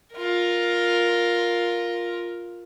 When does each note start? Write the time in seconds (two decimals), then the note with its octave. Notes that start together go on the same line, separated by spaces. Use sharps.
0.14 F4 A#4